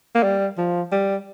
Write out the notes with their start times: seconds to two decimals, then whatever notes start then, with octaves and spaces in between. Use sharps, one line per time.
0.15 A#3
0.23 G3
0.58 F3
0.92 G3